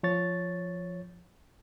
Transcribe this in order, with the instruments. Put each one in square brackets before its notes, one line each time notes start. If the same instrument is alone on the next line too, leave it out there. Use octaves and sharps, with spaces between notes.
[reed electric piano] F3 C#5 A6